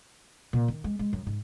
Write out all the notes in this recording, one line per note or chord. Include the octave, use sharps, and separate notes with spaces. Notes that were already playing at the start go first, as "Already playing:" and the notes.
A#2
D#3
G#3
G#3
F#2
G#2